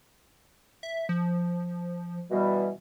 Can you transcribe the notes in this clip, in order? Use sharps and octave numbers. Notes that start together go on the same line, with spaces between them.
E5
F3
B2 E3 G3